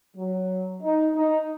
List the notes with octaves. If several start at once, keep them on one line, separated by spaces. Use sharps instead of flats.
F#3
D#4
D#4